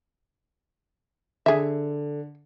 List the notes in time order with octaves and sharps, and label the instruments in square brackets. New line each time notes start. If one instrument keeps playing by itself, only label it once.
[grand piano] D3 [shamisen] G#4 E5